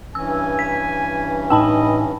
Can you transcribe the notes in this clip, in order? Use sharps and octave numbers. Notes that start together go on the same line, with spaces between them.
G2 E3 C#4 G#5 E6
B6
A2 D#4 D#5 G5 A5 B5 E6